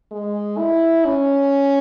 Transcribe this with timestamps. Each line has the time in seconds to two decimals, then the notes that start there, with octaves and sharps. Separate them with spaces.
0.11 G#3
0.58 E4
1.05 C#4